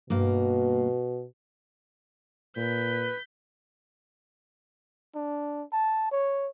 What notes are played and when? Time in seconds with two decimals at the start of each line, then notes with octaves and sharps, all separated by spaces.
0.10 G2 B2 A#3
2.57 A#2 B4 G6 B6
5.15 D4
5.72 A5
6.12 C#5